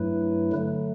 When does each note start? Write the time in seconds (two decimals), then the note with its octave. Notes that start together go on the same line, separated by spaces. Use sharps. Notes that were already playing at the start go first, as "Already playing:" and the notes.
Already playing: G2 F#3 A3 E4 B4
0.52 D3 F#3 A3